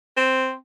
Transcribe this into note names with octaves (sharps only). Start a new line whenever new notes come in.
C4